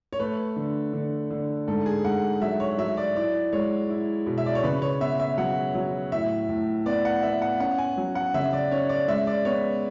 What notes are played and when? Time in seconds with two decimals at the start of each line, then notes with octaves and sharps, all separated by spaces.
0.13 C#5
0.19 A3 B4
0.56 D3
0.93 D3
1.31 D3
1.68 G#2 A4
1.86 G#4
2.04 G#2 F#5
2.41 F#3 E5
2.60 C#5
2.78 F#3 E5
2.97 D5
3.16 E4 D5
3.53 G#3 C#5
3.90 E4
4.27 B2
4.38 E5
4.46 D5
4.55 C#5
4.64 C#3 B4
4.82 C#5
5.01 B3 E5
5.20 E5
5.38 F#3 F#5
5.75 F#3
6.12 A2 E5
6.49 A2
6.86 B3 D5
7.05 F#5
7.23 B3 E5
7.42 F#5
7.60 C#4 F#5
7.78 G#5
7.97 F#3
8.15 F#5
8.34 C#3 E5
8.53 D5
8.71 C#4 C#5
8.89 D5
9.08 G#3 E5
9.27 D5
9.45 B3 C#5